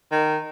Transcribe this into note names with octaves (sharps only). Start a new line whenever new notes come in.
D#3